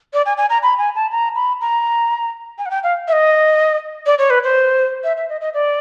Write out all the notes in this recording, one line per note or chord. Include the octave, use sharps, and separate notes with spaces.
D5
G#5
G#5
A#5
B5
G#5
A5
A#5
B5
A#5
G#5
F#5
G5
F5
E5
D#5
D5
C#5
B4
C5
E5
E5
D#5
D#5
D5